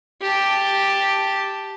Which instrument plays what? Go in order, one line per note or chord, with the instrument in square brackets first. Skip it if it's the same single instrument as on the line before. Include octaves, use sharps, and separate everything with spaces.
[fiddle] G4 A5